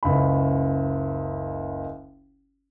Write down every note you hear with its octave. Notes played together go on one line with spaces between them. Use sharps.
F#1 C#2 B5